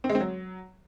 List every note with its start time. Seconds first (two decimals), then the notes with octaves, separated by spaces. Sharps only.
0.04 C4
0.09 G#3
0.15 C4
0.20 F#3